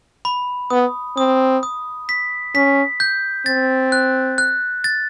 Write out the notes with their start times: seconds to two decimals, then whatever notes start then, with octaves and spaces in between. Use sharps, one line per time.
0.25 B5
0.70 B3 D#6
1.17 C4 D#6
1.63 D#6
2.09 B6
2.55 C#4 B6
3.00 G6
3.46 C4 A6
3.92 F#6
4.38 F#6
4.84 A6